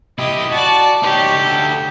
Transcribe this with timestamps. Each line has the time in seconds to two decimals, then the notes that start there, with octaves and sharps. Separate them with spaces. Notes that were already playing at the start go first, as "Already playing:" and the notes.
0.19 E4 G4 D#5
0.52 F#4 D5 A5
1.03 D#4 G4 C#5
1.36 D2 A4